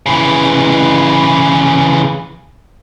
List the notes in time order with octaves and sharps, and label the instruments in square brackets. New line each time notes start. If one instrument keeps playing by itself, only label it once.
[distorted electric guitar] C#3 E3